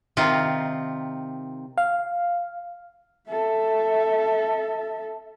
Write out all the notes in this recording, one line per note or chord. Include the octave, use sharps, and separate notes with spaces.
C3 D#3 D#4 F4
F5
A4 E5